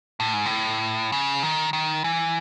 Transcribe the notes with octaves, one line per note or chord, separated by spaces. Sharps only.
A2
G#2
A2
C#3
D#3
D#3
E3